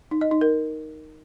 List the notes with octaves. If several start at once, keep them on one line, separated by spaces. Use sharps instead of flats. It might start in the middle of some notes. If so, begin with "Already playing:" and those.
D#4
D#5
D#4
A#4